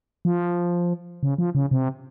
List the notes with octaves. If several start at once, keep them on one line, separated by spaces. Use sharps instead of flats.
F3
C#3
F3
C#3
C3